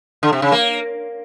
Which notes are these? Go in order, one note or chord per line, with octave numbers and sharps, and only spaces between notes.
D3
C3
C#3
A#3